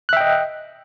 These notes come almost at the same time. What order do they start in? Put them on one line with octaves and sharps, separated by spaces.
F#6 E5 G5 D#5